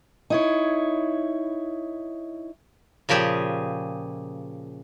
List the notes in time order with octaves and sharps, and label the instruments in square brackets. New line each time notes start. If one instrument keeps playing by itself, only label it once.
[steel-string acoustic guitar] D#4 E4 C#5
[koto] A#2 C#3 F3 G4 G#4